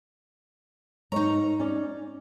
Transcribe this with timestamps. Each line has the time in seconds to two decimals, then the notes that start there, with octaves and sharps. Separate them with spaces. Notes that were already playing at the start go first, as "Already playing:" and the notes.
1.12 G#2 D#4 A#4 C#5 A#5
1.60 C#4 D5